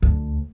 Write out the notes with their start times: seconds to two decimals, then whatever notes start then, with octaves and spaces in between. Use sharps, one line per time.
0.02 D2